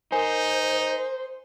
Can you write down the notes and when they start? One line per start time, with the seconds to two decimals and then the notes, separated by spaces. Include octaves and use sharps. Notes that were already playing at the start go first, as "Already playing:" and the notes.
0.12 D#4 A#4 C5 G#5